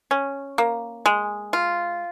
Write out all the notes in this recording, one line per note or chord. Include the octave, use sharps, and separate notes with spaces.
C#4
A#3
G#3
F4